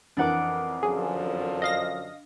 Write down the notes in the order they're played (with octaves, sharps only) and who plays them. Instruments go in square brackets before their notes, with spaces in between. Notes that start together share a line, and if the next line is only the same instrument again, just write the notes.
[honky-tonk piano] F2 E3 A#4 [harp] D4 F#5 D6
[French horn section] F#2 D3 F3 [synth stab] G#4
[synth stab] D#5 F5 A#6